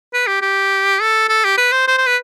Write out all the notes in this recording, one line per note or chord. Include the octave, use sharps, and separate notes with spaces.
B4
G4
G4
A4
A4
G4
B4
C5
C5
C5
B4